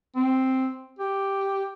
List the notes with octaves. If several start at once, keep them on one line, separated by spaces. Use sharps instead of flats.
C4
G4